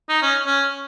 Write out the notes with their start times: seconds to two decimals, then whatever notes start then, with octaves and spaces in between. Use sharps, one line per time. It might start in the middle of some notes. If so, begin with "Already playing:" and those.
0.09 D#4
0.22 C#4
0.46 C#4